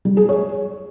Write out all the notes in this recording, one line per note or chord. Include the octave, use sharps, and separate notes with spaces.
G3
G#4
C#5